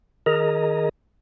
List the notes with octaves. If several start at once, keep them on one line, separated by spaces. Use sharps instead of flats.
D#3 G#4 A#4 D#5 A#5